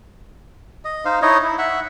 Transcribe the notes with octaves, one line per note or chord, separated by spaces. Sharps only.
D#5
D#4 C5 F5
D#4 E4 C#5 D#5
E4
E5 F#5